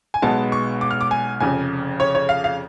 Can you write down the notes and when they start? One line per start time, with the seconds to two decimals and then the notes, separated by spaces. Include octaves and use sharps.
0.14 G#5
0.22 B1 B2 G#3 B3 A5
0.52 C#6
0.81 D6
0.91 F6
1.01 D6
1.11 G#5
1.40 F1 F2 C#3 G#5
2.00 C#5
2.15 C#5
2.29 F5
2.44 F5